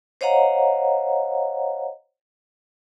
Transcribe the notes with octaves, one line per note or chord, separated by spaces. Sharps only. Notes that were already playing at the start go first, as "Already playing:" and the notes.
C5 C#5 D#5 F5 F#5 A#5